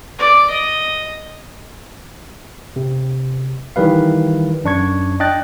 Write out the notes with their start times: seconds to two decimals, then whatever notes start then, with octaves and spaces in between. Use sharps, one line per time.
0.19 D5
0.50 D#5
2.76 C3
3.76 D#3 E3 G3 B4 F5
4.64 F#2 D4 C#6 G#6
5.20 D4 D#5 G5 F#6 A6